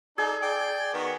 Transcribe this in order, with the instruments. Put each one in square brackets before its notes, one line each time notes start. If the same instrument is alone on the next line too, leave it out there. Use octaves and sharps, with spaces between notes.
[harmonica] D#4 A4 D5 [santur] G#4
[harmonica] D5 G5
D#3 B3 F#4